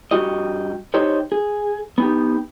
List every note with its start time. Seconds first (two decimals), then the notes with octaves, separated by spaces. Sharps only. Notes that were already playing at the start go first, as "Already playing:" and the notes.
0.11 G2 F#3 F#4 G4 D#5
0.94 D#4 G4 C5 C#5 D#5
1.32 G#4
1.98 B3 D#4 G4